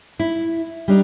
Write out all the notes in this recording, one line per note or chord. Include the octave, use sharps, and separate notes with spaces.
E4
G3 D4 D#4